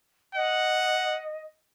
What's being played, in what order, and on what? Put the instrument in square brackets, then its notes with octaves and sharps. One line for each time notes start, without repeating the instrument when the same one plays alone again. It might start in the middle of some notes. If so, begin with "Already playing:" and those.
[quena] D#5 [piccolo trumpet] F#5